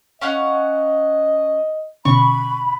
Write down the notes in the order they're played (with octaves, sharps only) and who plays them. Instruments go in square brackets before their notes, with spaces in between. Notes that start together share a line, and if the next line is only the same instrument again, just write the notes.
[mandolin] C#4 F5 F#5 [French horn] D#5
[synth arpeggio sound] B2 D3 C#4 [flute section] B5 [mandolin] C#6